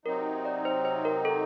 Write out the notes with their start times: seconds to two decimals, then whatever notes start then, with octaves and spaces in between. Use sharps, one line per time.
0.05 C3 F#3 C4 D#4 A#4
0.45 D5
0.65 C5
0.85 C5
1.05 A#4
1.25 A4